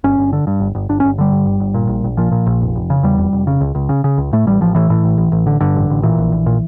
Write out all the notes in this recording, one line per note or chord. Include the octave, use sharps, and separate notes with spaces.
G1 C#4
G1
D3
G2
G1
G1
G1 D4
G1 C#4
D3 G3
G2
G1
G1
A#2
A#1
A#1
A#2 F3
A#2
A#1
F1
F1
C#3
E2 G3
F1
F1
C#3
C#2
C#2
C#3
C#3
C#2
A2 A3
A1 G3
A1 F3
A2 E3
A2
A1
A1
A1
D3
G2 D3
A1
A1
A#2 E3
A#1
A#1
A#2